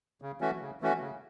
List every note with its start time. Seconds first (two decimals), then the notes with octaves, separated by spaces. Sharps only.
0.22 C#3
0.41 E3 A3 C#4 F#4
0.61 C#3
0.81 E3 A3 C#4 F#4
1.01 C#3